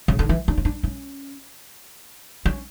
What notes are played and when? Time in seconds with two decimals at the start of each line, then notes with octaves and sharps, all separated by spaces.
0.08 C#3
0.19 D3
0.29 E3
0.48 D4
0.57 C#4
0.65 D4
0.83 C#4
2.45 C#4